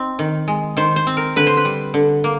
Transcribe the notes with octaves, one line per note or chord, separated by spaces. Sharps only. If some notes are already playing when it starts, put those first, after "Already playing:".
Already playing: C4 D#4
D#3
G#3
D#3 C5
C5
C4
A#4
D3 B4
C5
B4
G3
D3
A#3